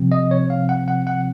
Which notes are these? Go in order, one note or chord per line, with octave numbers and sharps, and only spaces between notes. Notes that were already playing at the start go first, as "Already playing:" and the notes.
Already playing: C3 F3 C4
D#5
C#5
F5
F#5
F#5
F#5